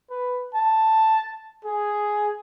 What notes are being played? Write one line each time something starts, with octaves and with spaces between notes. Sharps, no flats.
B4
A5
G#4